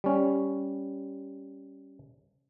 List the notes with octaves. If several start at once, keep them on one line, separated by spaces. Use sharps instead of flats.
G3 C#4